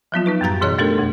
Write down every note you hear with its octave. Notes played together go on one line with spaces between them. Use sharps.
F3 F#3 B3 F4
B3 D#4 B4
F#2 A2 G3 F#4 A#5 A6
B2 E3 G#4 C#5 D#5 F#6
A3 D4 G4 A4 A#4
F2 B2